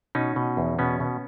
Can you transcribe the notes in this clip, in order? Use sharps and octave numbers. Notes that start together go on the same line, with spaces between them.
B2 C#4 D#4
B2
E2
B2 B3 C#4
B2